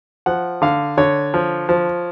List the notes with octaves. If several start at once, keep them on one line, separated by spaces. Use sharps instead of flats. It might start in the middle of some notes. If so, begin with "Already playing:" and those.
F3 F#5
D3 F5
D3 C#5
F3
F3